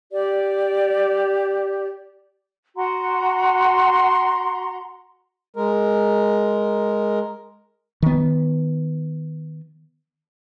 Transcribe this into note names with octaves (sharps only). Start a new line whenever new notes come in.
G4 D5
F#4 F#5 A#5 C6
G#3 A#4
D#3 B3